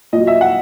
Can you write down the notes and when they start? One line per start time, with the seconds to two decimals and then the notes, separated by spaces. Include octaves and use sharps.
0.13 A#2 D#5
0.18 F#3
0.27 E5
0.41 F#5